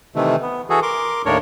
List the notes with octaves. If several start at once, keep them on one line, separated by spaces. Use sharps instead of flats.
C3 D#3 E3 A3
B3
E3 F#4 G#4 A4
A#4 C6 D6
D#2 A2 D4 A#4 C#5